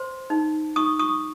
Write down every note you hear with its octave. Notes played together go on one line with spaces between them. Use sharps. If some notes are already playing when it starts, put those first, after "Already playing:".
Already playing: C5 C6
D#4
D#4 C#6 D#6
C#6 D#6